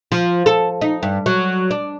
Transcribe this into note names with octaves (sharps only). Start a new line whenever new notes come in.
F3
A4
D#4
G2
F#3
D4